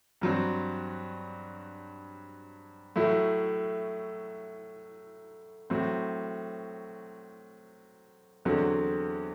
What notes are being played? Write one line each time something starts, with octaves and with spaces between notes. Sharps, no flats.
G2 F#3 C4
A2 F#3 A3 E4
A2 F#3 C4
E2 D3 F#3 C4